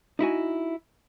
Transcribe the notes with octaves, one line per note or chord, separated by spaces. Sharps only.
D#4 E4 F#4 G#5